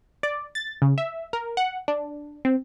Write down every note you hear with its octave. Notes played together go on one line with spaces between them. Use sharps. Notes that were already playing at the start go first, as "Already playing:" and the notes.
D5
A6
C#3
E5
A#4
F#5
D4
C4